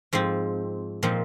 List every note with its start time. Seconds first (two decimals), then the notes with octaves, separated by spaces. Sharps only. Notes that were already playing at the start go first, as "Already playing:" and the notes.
0.13 G#2 F3 C4
1.03 A#2 F3 C4 D#4